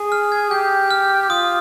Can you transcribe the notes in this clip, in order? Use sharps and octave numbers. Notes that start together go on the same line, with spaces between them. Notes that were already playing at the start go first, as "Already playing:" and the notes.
Already playing: G#4
F6
G#6
G4 G6
F6
F4 D#6